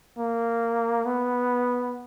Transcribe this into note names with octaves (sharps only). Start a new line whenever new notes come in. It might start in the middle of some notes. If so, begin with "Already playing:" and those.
A#3
B3